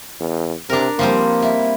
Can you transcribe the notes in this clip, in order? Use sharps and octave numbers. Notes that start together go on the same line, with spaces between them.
E2
C3 D4 A#4
F3 G3 A#3 C4
E4